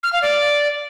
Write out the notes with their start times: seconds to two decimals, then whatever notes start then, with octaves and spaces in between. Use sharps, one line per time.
0.03 F6
0.13 F5
0.22 D5